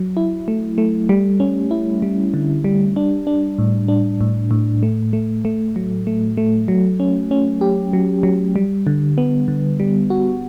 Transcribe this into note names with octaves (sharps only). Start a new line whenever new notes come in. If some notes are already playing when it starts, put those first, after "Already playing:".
Already playing: F#3
E4
A3
A3
G3
C#4
E4
G3
D3
G3
D4
D4
A2
D4
A2
A2
A3
A3
A3
F#3
A3
A3
F#3
C#4
C#4
G4
F#3
F#3
G3
D3
B3
D3
G3
F#4